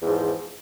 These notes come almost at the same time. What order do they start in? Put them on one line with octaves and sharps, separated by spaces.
E2 G#2 F3